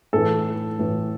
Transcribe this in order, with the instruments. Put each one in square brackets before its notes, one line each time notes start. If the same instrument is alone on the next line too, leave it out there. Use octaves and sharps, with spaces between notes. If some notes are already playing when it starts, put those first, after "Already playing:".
[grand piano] A2 E3 A4
A2 E3